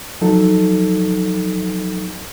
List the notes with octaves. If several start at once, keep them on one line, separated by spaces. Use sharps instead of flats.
F3 F#3 D#4 A4